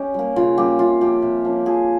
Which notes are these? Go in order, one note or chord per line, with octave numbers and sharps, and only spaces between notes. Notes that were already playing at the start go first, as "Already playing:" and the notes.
Already playing: C#4 G4 C#5 D#5
G3 A#3
C#3 F4
G3 A#3 G4
C3 F4
F3 A#3 C#4 G4
C3
F3 A#3 C#4
F3 G#4